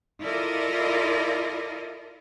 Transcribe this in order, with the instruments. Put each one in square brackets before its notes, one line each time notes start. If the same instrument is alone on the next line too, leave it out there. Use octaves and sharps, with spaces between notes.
[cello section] E4 F4 A4 A#4 D5 D#5